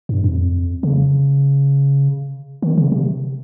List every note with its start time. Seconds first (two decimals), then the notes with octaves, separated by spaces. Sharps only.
0.09 G2
0.24 F2
0.83 C#3
2.62 D#3
2.78 C#3
2.92 C3